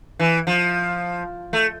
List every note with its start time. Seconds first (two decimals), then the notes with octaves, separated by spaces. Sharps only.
0.20 E3
0.47 F3
1.53 A3